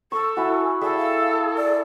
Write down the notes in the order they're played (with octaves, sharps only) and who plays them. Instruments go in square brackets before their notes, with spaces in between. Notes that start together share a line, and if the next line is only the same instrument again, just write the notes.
[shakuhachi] A4 [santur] C#6
[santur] E4 F#4 [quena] G#5
[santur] G#4 E5 G5 [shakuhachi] A4 [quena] D5
[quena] F5
D5